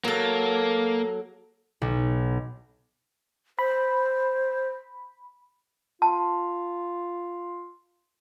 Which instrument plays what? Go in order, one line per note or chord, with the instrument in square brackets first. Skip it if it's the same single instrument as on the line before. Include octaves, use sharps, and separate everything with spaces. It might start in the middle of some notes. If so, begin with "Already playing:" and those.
[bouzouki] F#3 A4 [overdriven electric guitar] A#3
[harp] B1
[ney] C5 [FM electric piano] B5
[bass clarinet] F4 [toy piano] A5